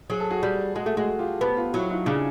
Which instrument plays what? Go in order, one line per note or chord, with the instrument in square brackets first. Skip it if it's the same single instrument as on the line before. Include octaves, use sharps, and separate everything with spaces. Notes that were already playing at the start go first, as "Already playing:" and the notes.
[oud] F#3 [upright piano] G#4
[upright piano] A4
F#4 G#4
[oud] G3
[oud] G#3 [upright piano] F#4 G#4
[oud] A3
[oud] G#3 [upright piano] F#4 G#4
[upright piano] F4 G4
[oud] B3 [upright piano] G4 A4
[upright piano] F4 G4
[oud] F#3 [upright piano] E4 F#4
[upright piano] D#4 F4
[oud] C#3 [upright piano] D4